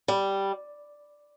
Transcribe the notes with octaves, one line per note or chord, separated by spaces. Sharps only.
G3